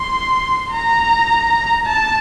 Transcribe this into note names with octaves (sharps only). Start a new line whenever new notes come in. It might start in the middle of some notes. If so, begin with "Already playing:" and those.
Already playing: C6
A#5
A5